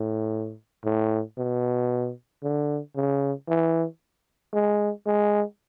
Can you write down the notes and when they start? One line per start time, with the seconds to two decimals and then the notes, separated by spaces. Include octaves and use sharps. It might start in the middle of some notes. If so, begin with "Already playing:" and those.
Already playing: A2
0.85 A2
1.38 B2
2.43 D3
2.96 C#3
3.48 E3
4.54 G#3
5.06 G#3